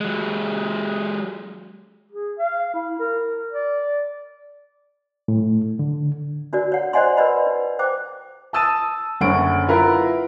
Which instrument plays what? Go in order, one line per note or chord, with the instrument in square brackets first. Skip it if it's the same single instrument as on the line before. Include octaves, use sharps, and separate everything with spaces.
[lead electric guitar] F#3 G#3
[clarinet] G#4
F5
E4
A#4
D5
[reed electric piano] A2
D3
[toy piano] D4 F#4 A#4 D5
C#5 F#5
C5 D5 D#5 F#5 G#5 C6
A#4 B4 D5 D#5 F#5 B5
D#4
C5 G5 D6
[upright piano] A5 D#6 E6 A6 D#7
F#1 D3 C#4 F#5 C#6 D7
E4 F4 A#4 B4 F#5 A#5